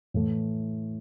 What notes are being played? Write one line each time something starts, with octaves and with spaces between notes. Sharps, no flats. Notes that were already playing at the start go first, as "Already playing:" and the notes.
A2 E3 A3